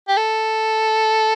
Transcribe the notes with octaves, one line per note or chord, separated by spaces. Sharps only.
G4
A4